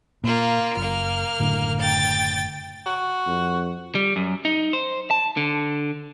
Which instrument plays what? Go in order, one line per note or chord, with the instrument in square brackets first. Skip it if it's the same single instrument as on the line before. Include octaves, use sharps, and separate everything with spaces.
[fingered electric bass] A#2 [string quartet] A#3 F4
[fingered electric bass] F#1 [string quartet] A#3 F6
[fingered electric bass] F#1 A2 D3
[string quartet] G5 A6
[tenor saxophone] F#4
[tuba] F2
[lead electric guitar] G3
F#2
D#4
C5
A5
D3